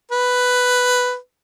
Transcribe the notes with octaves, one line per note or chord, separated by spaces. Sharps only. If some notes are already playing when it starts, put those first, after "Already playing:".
B4